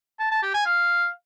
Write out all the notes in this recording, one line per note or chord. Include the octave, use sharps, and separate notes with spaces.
A5
A5
G4
G#5
F5